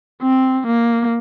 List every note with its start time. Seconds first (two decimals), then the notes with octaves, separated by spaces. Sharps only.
0.22 C4
0.67 A#3